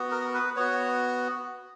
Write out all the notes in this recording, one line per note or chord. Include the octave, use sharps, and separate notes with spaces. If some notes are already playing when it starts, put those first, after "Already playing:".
Already playing: B3 F#4
A#4
B4
B3 F#4 C#5